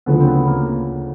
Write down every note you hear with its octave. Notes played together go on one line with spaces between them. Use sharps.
D2 C#3 F3 B3
C4
B3
A#3